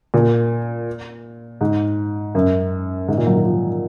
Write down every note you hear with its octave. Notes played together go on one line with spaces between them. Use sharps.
A#2
G#2
F#2
G#2
A#2
F#3
D#3
F3